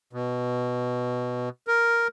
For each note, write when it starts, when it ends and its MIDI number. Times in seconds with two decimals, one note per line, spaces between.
0.13 1.49 47
1.67 2.08 70